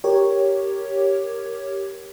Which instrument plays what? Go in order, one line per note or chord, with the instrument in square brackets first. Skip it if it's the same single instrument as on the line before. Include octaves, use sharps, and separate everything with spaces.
[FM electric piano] G4 A#4 C#5